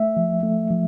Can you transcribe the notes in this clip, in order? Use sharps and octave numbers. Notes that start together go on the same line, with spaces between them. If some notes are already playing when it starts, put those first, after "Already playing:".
Already playing: A3 E5
F3
A3
F3